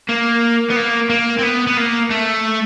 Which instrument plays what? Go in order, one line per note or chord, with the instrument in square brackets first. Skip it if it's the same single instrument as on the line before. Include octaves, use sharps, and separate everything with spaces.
[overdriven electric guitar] A#3
B3
A#3
A#3
C4
B3
B3
A#3
A3